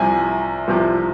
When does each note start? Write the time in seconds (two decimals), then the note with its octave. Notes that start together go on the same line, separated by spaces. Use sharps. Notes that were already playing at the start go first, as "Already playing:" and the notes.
Already playing: C2 C3 F3 G#5
0.68 C2 C3 F3